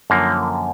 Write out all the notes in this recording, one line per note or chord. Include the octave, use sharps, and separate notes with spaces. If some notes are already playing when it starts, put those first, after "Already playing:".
F#2 D3 F3 A#3